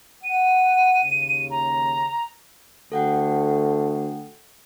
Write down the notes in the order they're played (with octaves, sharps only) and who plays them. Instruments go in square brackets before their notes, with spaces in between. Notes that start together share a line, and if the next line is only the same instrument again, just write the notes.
[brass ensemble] F#5 [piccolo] D#7
[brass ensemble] D#2 C#3
[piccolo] A#5
[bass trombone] D2 [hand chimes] A4 F#5 G5